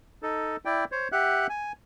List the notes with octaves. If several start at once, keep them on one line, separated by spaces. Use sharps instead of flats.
D#4 A4
E4 D5 G5
C5 C#5
G4 E5 F#5 F#6
G#5